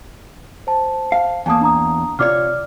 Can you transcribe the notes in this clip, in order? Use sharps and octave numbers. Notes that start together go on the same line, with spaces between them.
C5 A5
F5
E2 A#3 G#5 A5 D#6
D4 A#5 D#6
C3 F4 C#5 D5 D6 F6